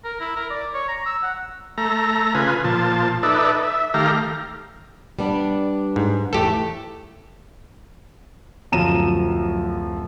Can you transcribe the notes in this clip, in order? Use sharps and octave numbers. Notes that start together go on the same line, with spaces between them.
A#4
E4
A#4
D5
C#5
A#5
E6
F#5
A3 A#5
C#3 F4 B4 G#5
A#2 F3 A5
D#4 A4 B4 D5 E5
E5
D#3 A3 G4 F5 A#5
G3 B3 D4
G#2
E2 A2 A3 G4 A4
D1 F#2 F3 A#5 D#7 E7